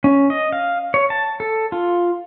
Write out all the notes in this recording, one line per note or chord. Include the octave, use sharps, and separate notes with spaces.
C#4
D#5
F5
C#5
A5
A4
F4